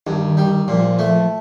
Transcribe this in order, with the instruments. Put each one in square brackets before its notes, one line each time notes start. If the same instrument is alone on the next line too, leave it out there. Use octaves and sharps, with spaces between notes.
[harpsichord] G2 [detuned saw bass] D#3
[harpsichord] G3
[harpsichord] A#2 [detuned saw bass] F3
[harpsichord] A3